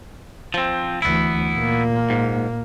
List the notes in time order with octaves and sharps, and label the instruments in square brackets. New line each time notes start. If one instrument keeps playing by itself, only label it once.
[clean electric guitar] F3 C4
[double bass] D2 E3 [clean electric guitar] B3 E4
[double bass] A#2 A#3
[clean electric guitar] G#2